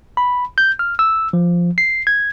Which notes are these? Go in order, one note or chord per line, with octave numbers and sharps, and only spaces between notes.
B5
G6
F6
E6
F3
C7
G#6